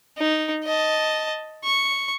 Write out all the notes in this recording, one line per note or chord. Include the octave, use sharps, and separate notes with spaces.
D#4
D#5 A5
C#6